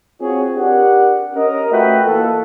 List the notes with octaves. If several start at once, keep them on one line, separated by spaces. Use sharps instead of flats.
C4 F4 F#4 G#4 C#5
D4 G4 A#4 D5 F#5
C#4 A#4 D#5
A3 F4 F#4 B4 E5 G5
E3 A#3 F4 A4